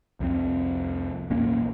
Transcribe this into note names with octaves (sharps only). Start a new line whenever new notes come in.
C2 F2 C4
A#1 E2 A#3 C#4